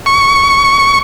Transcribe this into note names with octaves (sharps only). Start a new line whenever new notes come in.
C#6